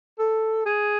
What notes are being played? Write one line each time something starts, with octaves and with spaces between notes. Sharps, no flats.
A4
G#4